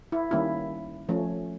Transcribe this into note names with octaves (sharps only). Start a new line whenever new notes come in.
E4
D#3 G3 A#3 C#4 E4
F3 A3 C#4